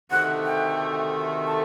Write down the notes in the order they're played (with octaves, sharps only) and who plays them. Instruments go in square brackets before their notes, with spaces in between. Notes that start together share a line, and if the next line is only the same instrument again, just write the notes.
[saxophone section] D2 C3 D#3 A3 [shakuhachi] F#5
[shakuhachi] G5
A5